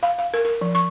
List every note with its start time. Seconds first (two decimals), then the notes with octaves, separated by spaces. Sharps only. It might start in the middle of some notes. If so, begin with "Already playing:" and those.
0.03 F5
0.18 F5
0.34 A#4
0.45 A#4
0.61 F3
0.75 C#6